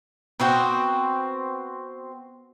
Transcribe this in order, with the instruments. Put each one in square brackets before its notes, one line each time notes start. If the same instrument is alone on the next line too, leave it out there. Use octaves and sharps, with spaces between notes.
[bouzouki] B3 C4 F#4 G5